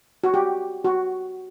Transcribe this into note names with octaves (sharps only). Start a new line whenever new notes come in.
F#4
G4
F#4